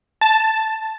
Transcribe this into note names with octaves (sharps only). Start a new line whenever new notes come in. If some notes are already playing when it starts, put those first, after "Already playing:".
A5